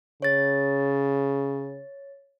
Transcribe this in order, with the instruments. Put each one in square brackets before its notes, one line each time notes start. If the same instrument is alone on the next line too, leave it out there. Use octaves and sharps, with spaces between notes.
[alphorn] C#3 [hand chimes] C#5 A6